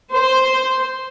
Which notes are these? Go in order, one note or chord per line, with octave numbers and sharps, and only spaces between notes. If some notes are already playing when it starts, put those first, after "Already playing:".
C5